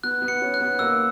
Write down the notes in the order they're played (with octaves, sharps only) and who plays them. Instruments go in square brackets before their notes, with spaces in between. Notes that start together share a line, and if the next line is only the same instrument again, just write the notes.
[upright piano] B3 [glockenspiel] F#6
[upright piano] B3
[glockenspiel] C#7
[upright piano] C#4
[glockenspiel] F#6
[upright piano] B3
[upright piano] A#3 [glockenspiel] E6